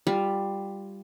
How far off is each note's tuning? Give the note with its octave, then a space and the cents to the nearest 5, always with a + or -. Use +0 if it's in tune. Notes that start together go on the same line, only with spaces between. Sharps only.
G3 +5 F4 +0